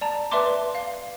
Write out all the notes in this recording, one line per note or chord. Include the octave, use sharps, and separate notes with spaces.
D5 A5 A#5
B4 D5 E5 A5 C6 D6
F5